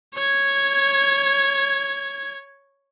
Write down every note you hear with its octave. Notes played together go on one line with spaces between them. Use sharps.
C#5 G#6